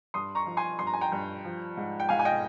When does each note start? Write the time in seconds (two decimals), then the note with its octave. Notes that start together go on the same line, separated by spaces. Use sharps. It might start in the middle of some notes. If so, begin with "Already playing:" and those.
0.14 G2 C6 D#6
0.35 A#5 C#6
0.46 F3
0.57 G#5 C6
0.79 G2 C6
0.87 A#5
0.93 G#5
1.01 G5 A#5
1.12 G2
1.44 F3
1.77 G#2
2.00 G5
2.09 G#2 F5 G#5
2.19 G#5
2.25 D#5 G5